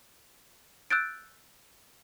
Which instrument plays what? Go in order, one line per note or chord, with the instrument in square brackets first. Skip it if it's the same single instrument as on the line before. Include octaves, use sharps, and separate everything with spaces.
[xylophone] E6 F#6 G6 A6 D7